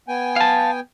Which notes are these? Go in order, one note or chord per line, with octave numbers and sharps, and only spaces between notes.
B3 G5 G#5
F5 A5